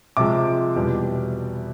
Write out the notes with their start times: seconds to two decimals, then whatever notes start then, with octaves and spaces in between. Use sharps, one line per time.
0.17 C3 F3 G#3 D6
0.76 E2 B2 G3